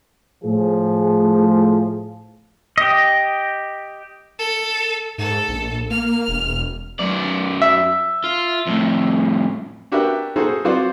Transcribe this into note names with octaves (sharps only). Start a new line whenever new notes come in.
A2 F3 G#4
G4 D#5
A4
G#2 A4
A#1
A#3 F6
E1
F#2 D5
E5
F4
F2 A2
D4 F#4 G4 A#4 B4 E5
D#4 F#4 G#4 A4 C5
F#3 C4 F4 F#4 C5 D5